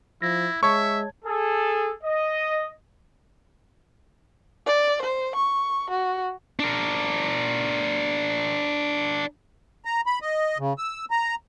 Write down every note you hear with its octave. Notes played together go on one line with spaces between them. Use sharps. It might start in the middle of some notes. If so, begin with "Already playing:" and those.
F3 E4 A#6
G#3 C#5 E5 A5 C#6 G#6
G#4 A4
D#5
D5
C5
C#6
F#4
D4 A#4
A#5
B5
D#5
C#3
E6
A#5